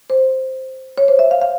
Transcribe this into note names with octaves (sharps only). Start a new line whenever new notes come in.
C5
C#5
C5
E5
F5
F5